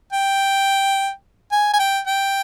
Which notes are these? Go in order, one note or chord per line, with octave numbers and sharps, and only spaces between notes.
G5
G#5
G#5
G5
G5